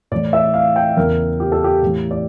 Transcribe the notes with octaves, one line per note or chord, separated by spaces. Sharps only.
A2 E3 D5
E5
F5
G5
E2 C#3 E3 A#4
G4
A4
G4
A2 E3
D5